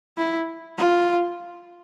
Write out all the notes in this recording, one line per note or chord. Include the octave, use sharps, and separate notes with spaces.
E4
F4